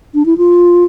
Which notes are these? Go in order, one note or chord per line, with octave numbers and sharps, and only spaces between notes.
D4
E4
F4